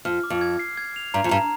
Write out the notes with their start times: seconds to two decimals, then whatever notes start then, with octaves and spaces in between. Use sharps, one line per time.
0.05 F2 F6
0.24 D6
0.30 F2
0.41 G#6
0.59 C7
0.77 G#6
0.96 F7
1.14 G2 A#5
1.24 F2
1.31 G2 A#5